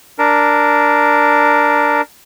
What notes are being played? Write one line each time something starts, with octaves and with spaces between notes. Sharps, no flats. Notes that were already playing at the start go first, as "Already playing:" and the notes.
D4 A#4